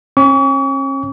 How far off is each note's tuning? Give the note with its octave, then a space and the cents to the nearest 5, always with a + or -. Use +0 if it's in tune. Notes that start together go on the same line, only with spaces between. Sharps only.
C#4 -40 C#6 +40